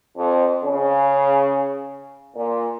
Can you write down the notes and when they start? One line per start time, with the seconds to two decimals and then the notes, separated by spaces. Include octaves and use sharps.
0.16 F2
0.63 C#3
2.35 A#2